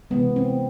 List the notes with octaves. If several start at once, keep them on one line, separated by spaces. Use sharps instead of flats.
C3 E3 G#3 B3
C4